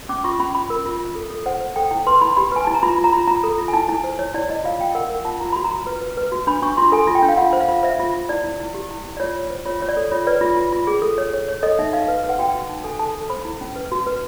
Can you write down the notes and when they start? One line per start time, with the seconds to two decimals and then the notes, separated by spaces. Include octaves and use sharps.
0.09 C#4 D6
0.24 F4 C#6
0.39 C#4 B5
0.55 F4 B5
0.70 A#4
0.85 F4
1.00 F4
1.15 A4
1.30 A4
1.46 C5 F#5
1.61 C5
1.76 A4 G5
1.91 E4 G5
2.07 B4 C6
2.21 E4 B5
2.37 G4 B5
2.52 B4 G#5
2.64 E4 A5
2.74 A#5
2.83 F4 B5
2.98 F4
3.04 A#5
3.12 F4 B5
3.28 F4 A#5
3.43 A4
3.58 F4
3.68 G#5
3.73 E4 A5
3.89 E4 G#5
4.04 C5
4.19 E4 C#5
4.34 E4 D5
4.49 E4 D#5
4.64 F4 F5
4.81 F4 G5
4.95 A#4 F#5
5.10 A#4
5.25 F4 A5
5.41 F4 A#5
5.53 F#4 B5
5.64 A#5
5.71 F#4
5.87 B4
6.01 B4
6.17 B4
6.32 F#4
6.47 D4 B5
6.62 D4 C#6
6.77 F4 C6
6.92 A4 G#5
7.07 F4
7.15 G5
7.22 D4
7.29 F5
7.38 F4 F#5
7.53 C5
7.60 F5
7.68 F4
7.83 C5 E5
7.99 F4
8.14 F4
8.29 E4 D5
8.44 E4
8.60 E4
8.74 G4
8.90 E4
9.05 E4
9.17 D5
9.20 F4 C#5
9.35 F4
9.50 C5
9.65 F4 C#5
9.81 F4 C#5
9.89 D5
9.97 A4
10.11 F4 C#5
10.27 B4 D5
10.41 F4
10.57 F4
10.73 F4
10.87 G#4
11.02 A4
11.18 C#5
11.33 C#5
11.49 C#5
11.63 A4 D#5
11.79 D#4 E5
11.93 D#4 F5
12.08 B4
12.24 B4
12.29 F#5
12.39 F#4 G5
12.55 F#4
12.69 D#4
12.84 A4 G#5
12.99 A4 A5
13.15 A4
13.30 C5 B5
13.45 E4
13.61 C#4
13.76 B4
13.92 F#4
14.07 B4